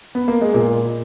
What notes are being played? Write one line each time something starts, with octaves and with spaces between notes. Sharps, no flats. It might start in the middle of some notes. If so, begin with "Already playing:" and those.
B3
A#3
G#3
A#2 A#3